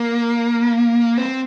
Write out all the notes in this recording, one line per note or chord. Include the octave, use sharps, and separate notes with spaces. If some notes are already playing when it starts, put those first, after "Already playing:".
Already playing: A#3
C4